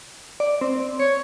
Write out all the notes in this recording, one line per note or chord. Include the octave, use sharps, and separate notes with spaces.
D5
C4
C#5 C#7